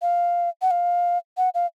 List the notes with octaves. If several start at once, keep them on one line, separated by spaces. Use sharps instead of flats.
F5
F#5
F5
F#5
F5